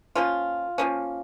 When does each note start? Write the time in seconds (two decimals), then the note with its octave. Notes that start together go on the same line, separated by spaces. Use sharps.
0.15 F3 A#3 C#4 F4
0.78 F3 A#3 C#4